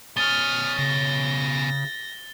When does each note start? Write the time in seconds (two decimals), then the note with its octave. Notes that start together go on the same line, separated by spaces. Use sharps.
0.17 B2 C#4 D#6 F6 A6 G7
0.79 C#3 A#6